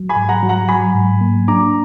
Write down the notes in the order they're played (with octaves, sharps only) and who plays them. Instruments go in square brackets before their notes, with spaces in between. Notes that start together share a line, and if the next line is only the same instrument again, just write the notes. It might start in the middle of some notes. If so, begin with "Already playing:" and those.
Already playing: [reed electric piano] F#3
[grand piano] G#5 B5
[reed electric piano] G#2
[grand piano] F#5 A#5
[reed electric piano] F#3
[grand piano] F#5 A#5
[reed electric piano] F#3 [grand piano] G#5 B5
[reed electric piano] G#2
A#3
[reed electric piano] D4 [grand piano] A#5 D6